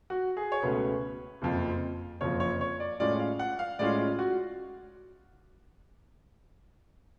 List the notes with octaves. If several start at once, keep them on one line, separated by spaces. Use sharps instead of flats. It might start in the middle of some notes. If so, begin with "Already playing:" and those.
F#4
G#4
C#5
C#2 B2 A3 C#4 B4
F#1 F2 F3
F#1 F2 F3 C#5
C#5
C#5
D5
A2 G#3 C#4 F4 D5
F5
F#5
F5
A2 G#3 C#4 F4 D5
F4
F#4